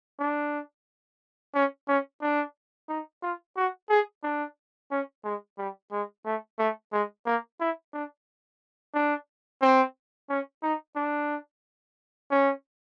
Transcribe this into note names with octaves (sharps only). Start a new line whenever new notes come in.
D4
C#4
C#4
D4
D#4
F4
F#4
G#4
D4
C#4
G#3
G3
G#3
A3
A3
G#3
A#3
E4
D4
D4
C4
C#4
D#4
D4
C#4